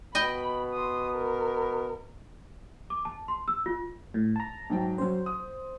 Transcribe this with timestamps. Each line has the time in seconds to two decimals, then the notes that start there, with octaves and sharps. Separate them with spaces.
0.15 B2 D#5 G5 B5
0.74 C6 D#6
1.12 A#4
2.90 D6
3.05 A5
3.28 C6
3.48 E6
3.66 F4
4.14 A2
4.36 A5 A#5
4.70 G#2 F#3 G5
4.98 F#3 C#4 C5
5.26 D#6